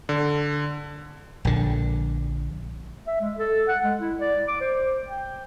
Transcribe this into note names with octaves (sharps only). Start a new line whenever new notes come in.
D3
A#1 D3
E5
G#3
A4
F#5
G#3
E4
D5
D6
C5
G5